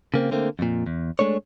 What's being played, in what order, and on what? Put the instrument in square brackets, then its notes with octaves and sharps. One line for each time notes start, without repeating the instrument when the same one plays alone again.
[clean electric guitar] C#3 A#3 C4
D3 A3 A#3 C4
F2 A#2
E2
G#3 A3 D4 C#5